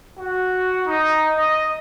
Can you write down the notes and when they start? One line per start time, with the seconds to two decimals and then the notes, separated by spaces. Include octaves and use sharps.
0.18 F#4
0.86 D#4
1.37 D#5